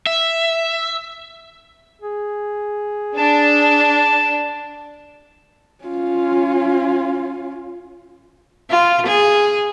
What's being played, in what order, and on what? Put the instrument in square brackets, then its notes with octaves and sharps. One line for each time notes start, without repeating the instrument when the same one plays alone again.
[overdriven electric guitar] E5
[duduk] G#4
[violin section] D4 [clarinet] A5
[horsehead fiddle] C#4 F4
[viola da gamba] F4
G#4